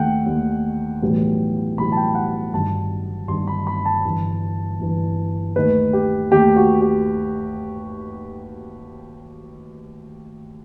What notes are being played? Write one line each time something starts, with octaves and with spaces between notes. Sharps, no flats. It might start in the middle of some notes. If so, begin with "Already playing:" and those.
Already playing: D#2 D#3 A3 F#5 G5
D#2 D#3 A3
B1 A2 E3 G3
B1 A2 E3 G3 B5
A5
G5
F#5
G1 G2 D#3 A5
G1 G2 D#3 C6
B5
B5
A5
G1 G2 E3
G1 G2 E3
D#2 D#3 A3 B4
G4
D#2 D#3 A3 G4
F#4
G4